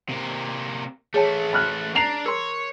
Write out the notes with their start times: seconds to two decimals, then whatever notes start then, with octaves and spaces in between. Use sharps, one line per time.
0.09 C3 A#3
1.14 E3 A3 G#4 C#5 A5
1.53 B5 F6 F#6
1.95 D4 A#5 C7 F7
2.26 A#4 C#5 C6